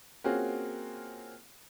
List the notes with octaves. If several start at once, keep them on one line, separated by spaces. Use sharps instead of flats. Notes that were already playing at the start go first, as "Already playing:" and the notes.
A#3 C4 C#4 F4 F#4 G#4